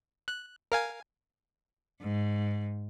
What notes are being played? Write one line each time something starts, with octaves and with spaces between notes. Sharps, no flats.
F#6
A#4 F5 G#5
G#2